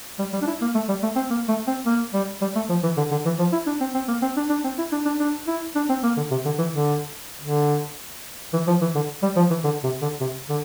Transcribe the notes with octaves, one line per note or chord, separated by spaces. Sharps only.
G3
G3
D4
E4
A#3
A3
G3
A3
C4
A#3
A3
C4
A#3
G3
G3
A3
F3
E3
D3
D3
E3
F3
E4
D4
C4
C4
A#3
C4
D4
D4
C4
E4
D4
D4
D4
E4
D4
C4
A#3
D3
C3
D3
E3
D3
D3
E3
F3
E3
D3
G3
F3
E3
D3
C3
D3
C3
D3